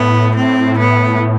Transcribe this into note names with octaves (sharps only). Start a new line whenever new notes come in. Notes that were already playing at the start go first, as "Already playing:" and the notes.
Already playing: A2 B3
C4
B3